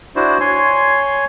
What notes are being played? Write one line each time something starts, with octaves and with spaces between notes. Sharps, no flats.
D4 E4 F#4 C5
C#5 G#5 C6